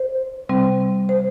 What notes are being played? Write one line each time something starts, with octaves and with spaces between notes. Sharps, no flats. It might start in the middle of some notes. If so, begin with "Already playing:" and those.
Already playing: C5
C3 G3 C4
C5